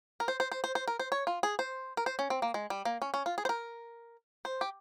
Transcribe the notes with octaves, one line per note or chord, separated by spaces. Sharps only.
A#4
C5
C5
C5
C5
C5
A#4
C5
C#5
F4
G#4
C5
A#4
C5
C#4
C4
A#3
G#3
G3
A#3
C#4
C#4
F4
G#4
C5
A#4
C5
G4